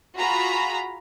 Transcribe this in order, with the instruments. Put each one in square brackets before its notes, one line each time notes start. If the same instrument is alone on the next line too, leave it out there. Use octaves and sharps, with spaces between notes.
[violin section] F4 F#4 G#4 A#5 B5